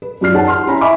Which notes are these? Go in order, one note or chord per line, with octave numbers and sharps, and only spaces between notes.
B4
F#2 F4 D5 F6 C7
D#4 G#4 C#5 F#5 A5
C6 F6
C#4 E4 C#5 G#5 A#5 B5
D#5 E5 G#5 B5 C#6 D6